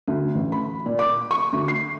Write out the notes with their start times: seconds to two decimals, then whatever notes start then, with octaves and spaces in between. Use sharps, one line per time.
0.07 D2
0.35 A1
0.52 B5
0.86 A#2
0.99 D6
1.31 C#6
1.53 D2
1.68 C7